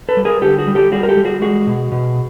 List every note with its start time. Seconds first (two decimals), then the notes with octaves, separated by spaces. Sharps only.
0.09 A4 B4
0.17 G3
0.25 G#4 A#4
0.42 D3 G4 A4
0.59 F#4 G#4
0.67 G3
0.75 G4 A4
0.92 G3 F#4 G#4
1.03 A#4
1.09 G4 A4
1.17 G3
1.25 F#4 G#4
1.42 G#3 F#4 G#4
1.67 B2
1.92 B2